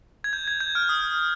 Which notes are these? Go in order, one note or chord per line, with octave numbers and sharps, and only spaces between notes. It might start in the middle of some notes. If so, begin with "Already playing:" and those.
G#6
G6
G#6
G6
F6
D#6